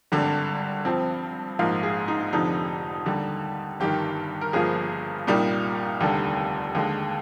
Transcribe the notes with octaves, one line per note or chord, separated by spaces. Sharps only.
G#1 G2 D3 G3
G2 F3 C4
A#1 G#2 F3 A#3 F5
G#4
D#4
F1 F2 D3 F3 D#4
D#2 D3 G3
G1 G2 D#3 G4
A#4
G1 G2 F3 A#3 G#4
C2 A#2 G3 A#3 D#4
F1 D#2 D3 G3
D#2 D3 G#3